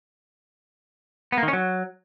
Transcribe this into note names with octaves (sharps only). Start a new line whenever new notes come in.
B3
A#3
D#3
C#4
F#3